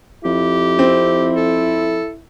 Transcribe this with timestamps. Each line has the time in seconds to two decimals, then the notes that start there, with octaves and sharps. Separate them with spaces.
0.25 F2 E4 G4
0.79 C4
1.36 A4